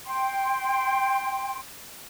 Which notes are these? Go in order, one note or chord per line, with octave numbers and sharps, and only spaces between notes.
G5 C6